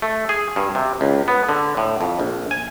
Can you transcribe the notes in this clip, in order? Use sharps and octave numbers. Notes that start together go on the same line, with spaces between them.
A3
G#4
G2
C3
C#2
B3
D3
A2
F2
A#1
G#5